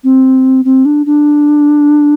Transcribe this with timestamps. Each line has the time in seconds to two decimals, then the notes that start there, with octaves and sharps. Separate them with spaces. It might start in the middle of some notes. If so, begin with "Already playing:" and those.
0.04 C4
0.65 C4
0.85 D4
1.06 D4